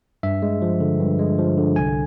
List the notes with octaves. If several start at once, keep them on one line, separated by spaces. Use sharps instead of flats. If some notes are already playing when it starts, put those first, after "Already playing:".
G2 E5
G#3
F3
D3
G2
G#3
F3
D3
C2 G#5